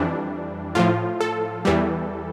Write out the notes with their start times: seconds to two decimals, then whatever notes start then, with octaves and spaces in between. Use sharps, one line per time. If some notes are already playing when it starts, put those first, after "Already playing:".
Already playing: F2 E3 G3 D4
0.75 A2 F3 F4
1.20 A4
1.65 E2 E3 G3